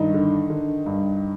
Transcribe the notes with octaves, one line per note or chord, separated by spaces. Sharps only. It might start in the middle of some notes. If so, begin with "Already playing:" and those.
Already playing: G2 D#3 D#4
D3
D3
G2